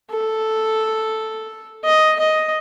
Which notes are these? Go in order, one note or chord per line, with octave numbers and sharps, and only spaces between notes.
A4
D#5
D#5